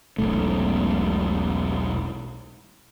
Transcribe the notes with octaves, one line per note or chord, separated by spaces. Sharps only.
E1 B1 A3